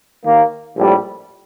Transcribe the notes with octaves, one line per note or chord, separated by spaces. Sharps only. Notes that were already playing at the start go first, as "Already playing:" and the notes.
D#2 D#3 A#3
A#1 A2 G3